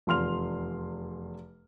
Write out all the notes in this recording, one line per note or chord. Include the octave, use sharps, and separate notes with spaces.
F1 E2 C6 F6 F7